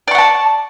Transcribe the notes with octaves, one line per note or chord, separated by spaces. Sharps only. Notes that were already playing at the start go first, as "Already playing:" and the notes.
D5 F#5 A5 C#6